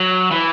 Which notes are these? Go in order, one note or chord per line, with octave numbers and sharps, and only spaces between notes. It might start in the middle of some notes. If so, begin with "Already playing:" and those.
Already playing: F#3
E3